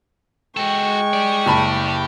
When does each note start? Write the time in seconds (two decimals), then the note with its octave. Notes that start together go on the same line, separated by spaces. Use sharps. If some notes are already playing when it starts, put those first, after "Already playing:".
0.57 G#3 F#4 A4 G5 C#6
1.13 G4 D5
1.46 F#1 A5 B5